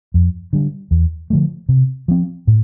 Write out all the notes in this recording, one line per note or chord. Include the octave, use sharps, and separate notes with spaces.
F2
D3 G3
E2
D3 F3 A3
C3
F3 C4
A2